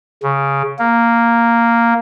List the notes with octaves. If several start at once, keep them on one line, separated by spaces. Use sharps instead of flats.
C#3
A#3